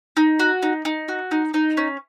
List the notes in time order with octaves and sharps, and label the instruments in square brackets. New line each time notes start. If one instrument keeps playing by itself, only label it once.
[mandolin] D#4
F#4
D#4
D#4
F#4
D#4
D#4
C#4